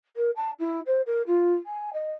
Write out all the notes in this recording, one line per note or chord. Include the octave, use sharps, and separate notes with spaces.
A#4
A5
E4
C5
A#4
F4
G#5
D#5